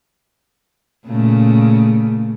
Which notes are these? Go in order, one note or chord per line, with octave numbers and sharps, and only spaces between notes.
A#2 C#3 A3